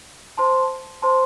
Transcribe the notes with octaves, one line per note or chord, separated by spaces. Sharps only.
C5 A5 C6
C5 A5 C6